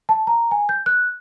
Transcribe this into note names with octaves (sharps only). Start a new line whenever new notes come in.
A5
A#5
G#5
G6
F#6